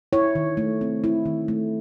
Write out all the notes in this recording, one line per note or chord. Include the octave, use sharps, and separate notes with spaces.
E4 C#5
D#3
A3
C4
E4
D#3
A3